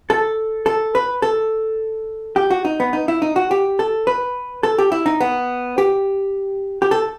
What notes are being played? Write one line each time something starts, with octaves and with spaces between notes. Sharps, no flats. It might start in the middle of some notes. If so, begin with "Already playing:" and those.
A4
A4
B4
A4
G4
F#4
D#4
B3
D#4
E4
D#4
F#4
G4
A4
B4
A4
G4
E4
D#4
B3
G4
G4
A4